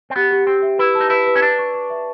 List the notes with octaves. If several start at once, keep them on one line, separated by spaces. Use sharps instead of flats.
C4
B3 G4
G4
C4 G4
E5
E4 B4
A5
D#4
E4 B4
B4
C#4
D4 A5
C#6
C#6
E5